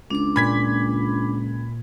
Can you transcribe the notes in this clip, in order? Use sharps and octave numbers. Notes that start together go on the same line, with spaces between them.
C#2 D4 D6
A#2 B5 G#6 B6